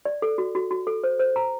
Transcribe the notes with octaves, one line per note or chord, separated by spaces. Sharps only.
D5
A4
F#4
F#4
F#4
A4
C5
C5
A#5